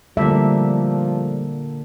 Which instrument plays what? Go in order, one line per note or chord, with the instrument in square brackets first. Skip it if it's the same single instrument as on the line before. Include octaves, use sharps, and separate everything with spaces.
[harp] A#2 D3 [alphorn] F3 [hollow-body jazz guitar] G3 A3 [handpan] E5